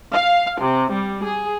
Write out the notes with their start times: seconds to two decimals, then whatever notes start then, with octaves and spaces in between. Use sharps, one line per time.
0.13 F5
0.62 C3
0.93 G3
1.24 G#4